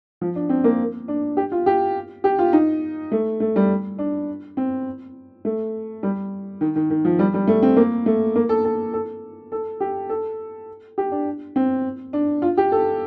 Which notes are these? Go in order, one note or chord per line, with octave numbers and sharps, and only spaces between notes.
F3
D4
C4
A#3
D4
G4
F4
G4
G4
F4
D#4
A3
A3
G3
D4
C4
A3
G3
D#3
D#3
D#3
F3
G3
G3
A3
C4
A#3
A3
A#3
A4
A4
A4
A4
G4
A4
G4
D4
C4
D4
F4
G4
A4